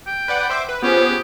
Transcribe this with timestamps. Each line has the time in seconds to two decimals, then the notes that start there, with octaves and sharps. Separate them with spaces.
0.07 G5
0.28 B4 D5 F#5
0.50 C5 E5 D6
0.69 B4
0.83 B3 C#4 F4 G4 G#4 C5
1.05 D#6